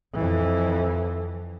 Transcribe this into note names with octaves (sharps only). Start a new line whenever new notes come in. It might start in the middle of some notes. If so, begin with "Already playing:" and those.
F2 E3